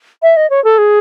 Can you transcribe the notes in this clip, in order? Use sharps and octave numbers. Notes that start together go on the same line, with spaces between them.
E5
D#5
C#5
A4
G#4